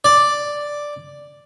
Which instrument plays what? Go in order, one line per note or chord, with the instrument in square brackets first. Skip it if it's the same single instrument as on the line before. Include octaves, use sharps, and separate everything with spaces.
[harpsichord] D5